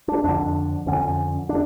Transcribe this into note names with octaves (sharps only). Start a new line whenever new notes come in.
D4
F2 D3 D4
F2 D3 C#4
D4